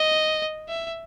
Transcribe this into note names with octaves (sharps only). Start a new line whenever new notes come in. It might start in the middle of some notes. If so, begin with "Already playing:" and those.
Already playing: D#5
E5